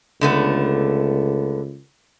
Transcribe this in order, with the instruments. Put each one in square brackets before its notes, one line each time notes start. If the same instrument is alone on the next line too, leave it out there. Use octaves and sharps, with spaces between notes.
[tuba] C#2 [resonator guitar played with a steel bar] D3 A3 B3